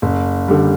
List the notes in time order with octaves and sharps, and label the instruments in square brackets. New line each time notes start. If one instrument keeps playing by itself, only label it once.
[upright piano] F#1
D3 G3